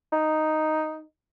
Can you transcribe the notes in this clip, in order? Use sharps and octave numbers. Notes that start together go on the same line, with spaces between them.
D#4